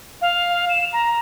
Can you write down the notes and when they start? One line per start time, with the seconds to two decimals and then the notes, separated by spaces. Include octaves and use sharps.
0.22 F5
0.69 E7
0.93 A#5